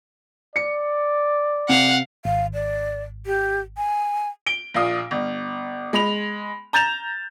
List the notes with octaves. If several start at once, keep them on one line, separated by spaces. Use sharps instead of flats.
D5 C#7
C3 F5 F#5
G#1 F5
D5
G4
G#5
D7 G7
A#1 A#2 F5 D#6
G1
G#3 B5 F7
A#5 G6 A6 E7 F7